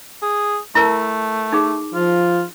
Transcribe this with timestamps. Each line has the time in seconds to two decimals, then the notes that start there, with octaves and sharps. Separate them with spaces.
0.22 G#4
0.75 A3 E4 A#4 A5
1.53 D#4 G#4
1.94 F3 F4